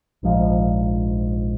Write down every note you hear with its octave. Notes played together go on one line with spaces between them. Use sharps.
A#1 G#2 F3